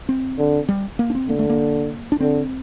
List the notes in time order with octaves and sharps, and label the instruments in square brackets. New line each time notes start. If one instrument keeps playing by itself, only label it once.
[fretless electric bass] C4
[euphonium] D3
[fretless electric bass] G3
A#3
D4
C4
[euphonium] D3 [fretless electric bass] A#3
[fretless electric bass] A3
A#3
D4
[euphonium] D3 [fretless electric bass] C4